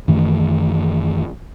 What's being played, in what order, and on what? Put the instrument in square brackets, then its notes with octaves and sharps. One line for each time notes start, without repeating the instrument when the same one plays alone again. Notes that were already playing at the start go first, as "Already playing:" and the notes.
[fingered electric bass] F#2 D#3 E3 A3